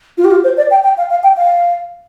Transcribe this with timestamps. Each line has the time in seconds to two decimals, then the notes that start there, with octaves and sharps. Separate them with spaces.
0.18 F4
0.24 G4
0.31 F4
0.44 C5
0.57 D5
0.71 G5
0.84 G5
0.97 F5
1.10 F5
1.23 G5
1.37 F5